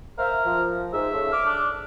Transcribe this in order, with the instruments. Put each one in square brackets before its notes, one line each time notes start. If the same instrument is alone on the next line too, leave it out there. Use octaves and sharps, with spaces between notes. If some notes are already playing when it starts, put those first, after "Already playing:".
[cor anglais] A#4 [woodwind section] C5 E5 F5
[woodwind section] F3
[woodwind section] G#2 [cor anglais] E5
[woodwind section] C#3 A3
D6 F6
[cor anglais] D4